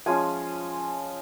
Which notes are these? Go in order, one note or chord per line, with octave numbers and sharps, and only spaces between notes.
F3 G#3 C#4 F4 G#5